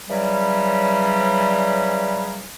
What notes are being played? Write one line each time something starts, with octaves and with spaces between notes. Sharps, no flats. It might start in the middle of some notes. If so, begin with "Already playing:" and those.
C#3 E3 F#3 G3